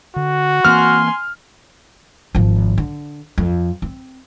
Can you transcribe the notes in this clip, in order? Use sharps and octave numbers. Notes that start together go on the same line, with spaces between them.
D3 F#4
E3 A#3 C4 G#5 C6 F6
G#1 F3
D3
F2
C4